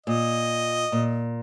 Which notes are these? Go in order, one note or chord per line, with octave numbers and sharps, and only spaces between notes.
A#2 D#5
A#2